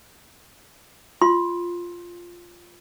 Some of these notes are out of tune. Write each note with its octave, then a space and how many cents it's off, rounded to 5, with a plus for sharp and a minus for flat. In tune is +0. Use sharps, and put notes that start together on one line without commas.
F4 +0 C6 +10